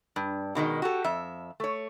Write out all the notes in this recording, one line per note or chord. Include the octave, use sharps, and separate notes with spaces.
G2
B2 D#3 F#3 G#3
F#4 G4 A4
F2 E5
A3 C#5